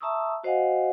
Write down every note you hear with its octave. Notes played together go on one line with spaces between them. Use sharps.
E5 A5 A#5 C#6 D#6 E6
F#4 C5 D#5 F5 F#5 G#5